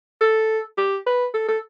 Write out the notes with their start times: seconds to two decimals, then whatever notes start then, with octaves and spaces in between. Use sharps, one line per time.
0.21 A4
0.78 G4
1.06 B4
1.34 A4
1.48 A4